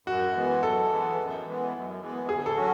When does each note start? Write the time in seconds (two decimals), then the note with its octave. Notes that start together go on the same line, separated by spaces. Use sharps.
0.07 F#2 F#4
0.35 E3 G#3 B3
0.63 F#2 A4
0.90 E3 G#3 B3
1.18 F#2
1.46 E3 G#3 B3
1.73 F#2
2.00 E3 G#3 B3
2.28 D2 G#4
2.46 A4
2.56 F#3 C#4 F#4